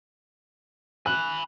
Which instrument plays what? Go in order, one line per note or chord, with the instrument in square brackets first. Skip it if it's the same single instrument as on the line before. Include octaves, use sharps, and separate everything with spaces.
[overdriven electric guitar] G#5 B5 [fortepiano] F#6